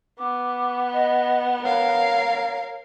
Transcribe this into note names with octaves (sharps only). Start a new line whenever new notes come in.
B3 D6
D#5
A#4 C#5 F5